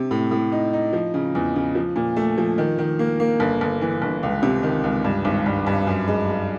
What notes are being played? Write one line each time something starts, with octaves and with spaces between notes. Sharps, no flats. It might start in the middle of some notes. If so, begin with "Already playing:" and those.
Already playing: C3
A2
A2
D#4
D#4
F3
C#3
E2
C#3
F3
A#2
A3
F3
D#3
D#3
A#3
A#3
G1
G1
E3
G1
C#2
C3
D#3
C#2
G2
G#1
G2
G2
F#2
G#3
G#3